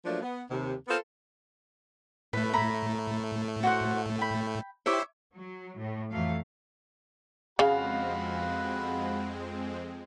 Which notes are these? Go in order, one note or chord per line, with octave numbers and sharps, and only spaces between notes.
F3 F#3 A3 A#3 D4
B3
D#2 C3
B3 F4 A4 A#4 C5
A2 A3 B4
E4 A#5 B5
F#4 C5 F#5
G5 B5
E4 G4 C5 C#5 E5 D6
F#3
A2
F2 E3 F#3 A3 F5
F2 C#3 G#3 C4 F#4 F5 F#5 B5